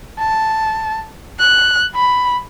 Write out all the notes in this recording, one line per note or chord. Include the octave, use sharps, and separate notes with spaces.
A5
F#6
B5